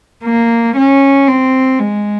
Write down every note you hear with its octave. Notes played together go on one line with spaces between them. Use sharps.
A#3
C#4
C4
G#3